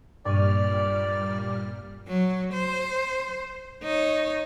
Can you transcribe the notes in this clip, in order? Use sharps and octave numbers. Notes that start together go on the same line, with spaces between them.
G2 A#2 G3 D5 C#6 F6 D#7
F#3
C5
D#4 C#5